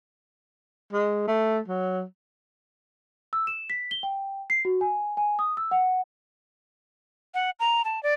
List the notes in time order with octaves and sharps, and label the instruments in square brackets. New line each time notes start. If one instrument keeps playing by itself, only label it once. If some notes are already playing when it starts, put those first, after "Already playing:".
[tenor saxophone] G#3
A3
F#3
[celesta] E6
E7
B6
G7
G5
C7
F#4
G#5
G#5
D#6
E6
F#5
[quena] F#5
A#5
A5
D5